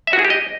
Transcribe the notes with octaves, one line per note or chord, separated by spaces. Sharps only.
E5
F#4
G#4
G4
D#5